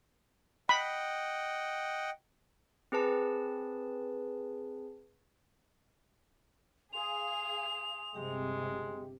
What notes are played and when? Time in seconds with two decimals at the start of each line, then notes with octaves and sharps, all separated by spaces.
0.69 D#5 F#5 G5 B5
2.92 C4 G#4 B4 A5
6.93 G#4 F5 C6 D#6 F7
8.14 G1 C3 G#3 G4 G5